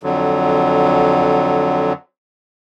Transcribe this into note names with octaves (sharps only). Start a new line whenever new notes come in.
F2 D3 F#3